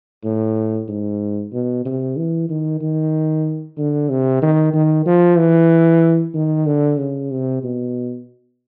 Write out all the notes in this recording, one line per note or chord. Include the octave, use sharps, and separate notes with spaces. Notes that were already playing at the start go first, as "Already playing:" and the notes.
A2
G#2
B2
C3
E3
D#3
D#3
D3
C3
D#3
D#3
F3
E3
D#3
D3
C#3
C3
B2